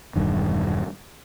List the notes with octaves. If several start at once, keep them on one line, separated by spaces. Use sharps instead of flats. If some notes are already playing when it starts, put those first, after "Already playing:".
E1 G2 D#3